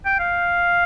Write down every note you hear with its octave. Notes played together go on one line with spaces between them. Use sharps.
G5
F5